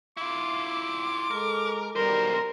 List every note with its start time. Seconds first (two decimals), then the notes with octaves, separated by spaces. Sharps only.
0.17 E4 F4 D6
1.31 G#3 A4 A#4
1.96 B1 B2 D#3 G3 A#4 C5